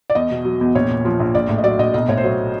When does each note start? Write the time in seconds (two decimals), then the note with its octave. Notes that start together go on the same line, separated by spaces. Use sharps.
0.10 D5
0.15 E2 D#5
0.31 B2
0.45 F#3
0.61 E2
0.75 A#1 C#5
0.90 A#2
1.05 F3
1.20 A#1
1.35 A#1 D5
1.49 A2
1.58 D#5
1.64 F#3 D5
1.79 A#1 D#5
1.94 B1 D#5
2.08 A2 C#5
2.17 C5
2.23 F#3 C#5